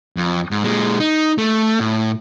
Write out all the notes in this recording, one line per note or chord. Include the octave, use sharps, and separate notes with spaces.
F2
G#2
A#2 G#3
D#4
A3
A2